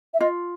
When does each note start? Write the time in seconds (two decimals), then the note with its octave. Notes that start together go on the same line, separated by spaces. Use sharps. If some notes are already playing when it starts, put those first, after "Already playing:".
0.14 E5
0.20 F4 D#5